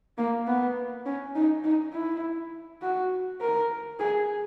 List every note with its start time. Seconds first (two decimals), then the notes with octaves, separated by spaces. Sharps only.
0.18 A#3
0.47 B3
1.06 C#4
1.35 D#4
1.64 D#4
1.93 E4
2.82 F#4
3.41 A#4
4.00 G#4